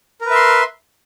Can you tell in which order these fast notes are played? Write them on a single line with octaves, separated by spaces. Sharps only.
A#4 B4 E5 C6